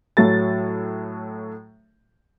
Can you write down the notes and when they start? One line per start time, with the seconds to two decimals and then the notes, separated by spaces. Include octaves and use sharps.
0.17 A2 F#3 A4 A6